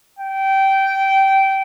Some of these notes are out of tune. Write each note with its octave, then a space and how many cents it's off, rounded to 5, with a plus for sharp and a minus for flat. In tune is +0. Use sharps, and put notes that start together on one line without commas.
G5 -15